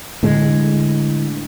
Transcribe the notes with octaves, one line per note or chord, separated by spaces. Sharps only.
A2 D3 G#3